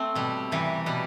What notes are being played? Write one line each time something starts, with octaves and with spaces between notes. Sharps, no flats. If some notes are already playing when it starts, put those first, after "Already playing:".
Already playing: A3 C4
B2 G3
C3 E3 G3
B2 G3